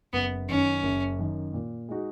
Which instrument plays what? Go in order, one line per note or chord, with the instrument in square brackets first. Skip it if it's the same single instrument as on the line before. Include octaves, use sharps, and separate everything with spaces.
[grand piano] F#1 [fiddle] B3
[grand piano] F#2 D#3 [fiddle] C#4
[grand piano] F#1
F#2 D#3
A#2
G#3 D#4 F#4